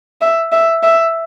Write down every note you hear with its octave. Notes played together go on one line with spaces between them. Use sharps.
E5
E5
E5